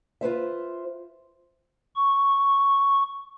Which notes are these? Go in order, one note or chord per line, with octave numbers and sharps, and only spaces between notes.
F4 B4 C5 E5
C#6